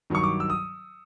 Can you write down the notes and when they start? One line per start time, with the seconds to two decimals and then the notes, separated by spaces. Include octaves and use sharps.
0.10 G2 D#3 F#3 C#6
0.23 D6
0.40 E6
0.50 D#6